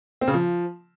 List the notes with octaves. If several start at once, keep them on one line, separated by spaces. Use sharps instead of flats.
C4
C#3
F3